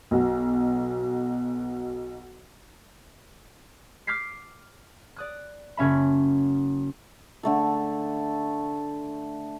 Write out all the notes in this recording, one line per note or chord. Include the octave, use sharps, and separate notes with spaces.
B1 B2
D6 F6 G6 B6 C7
D5 D#6 F#6
F#1 C#4 E5 B5
D3 A3 A4